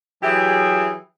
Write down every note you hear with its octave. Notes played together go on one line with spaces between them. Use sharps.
E3 F#3 E4 G4 G#4